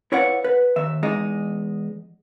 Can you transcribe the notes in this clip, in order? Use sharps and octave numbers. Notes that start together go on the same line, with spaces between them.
E4 B4 C#5 D5 F5 F#5
B4
D#2 E5
E2 G#3 D#4